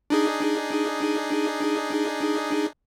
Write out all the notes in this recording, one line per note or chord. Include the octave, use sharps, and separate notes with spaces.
D4 D#4 G#4